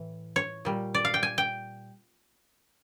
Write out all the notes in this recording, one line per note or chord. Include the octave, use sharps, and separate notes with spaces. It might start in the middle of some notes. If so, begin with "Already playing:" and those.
Already playing: A2 E3
C#5
A#2 G3
D5
F5
G5
G#5
G5